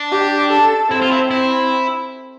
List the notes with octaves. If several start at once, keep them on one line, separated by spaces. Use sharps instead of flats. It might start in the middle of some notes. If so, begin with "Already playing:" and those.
Already playing: D4
G4
A4
C4 E4
F4
E4
C4 E4